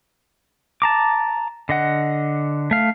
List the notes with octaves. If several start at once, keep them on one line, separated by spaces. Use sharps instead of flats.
A5 A#5 D6
D3 D#5 F#5
A3 F5